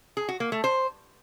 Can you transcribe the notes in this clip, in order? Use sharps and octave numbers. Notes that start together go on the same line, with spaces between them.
G#4
F#4
A#3
A3
C5